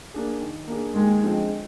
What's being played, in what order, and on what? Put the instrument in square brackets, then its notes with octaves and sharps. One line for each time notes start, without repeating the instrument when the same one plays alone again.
[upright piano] A#3 D4 G#4
D#3
A#3 D4 G#4
[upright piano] D#2 [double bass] G#3
[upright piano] D3 F3 G#3 C4